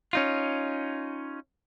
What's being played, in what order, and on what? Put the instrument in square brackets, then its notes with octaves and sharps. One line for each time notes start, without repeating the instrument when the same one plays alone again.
[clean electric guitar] C#4 D#4 F4